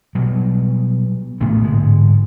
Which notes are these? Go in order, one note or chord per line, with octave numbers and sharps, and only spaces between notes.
B2 F#3 G3
A#1 A2 A3 B3
G#2 D3 G#3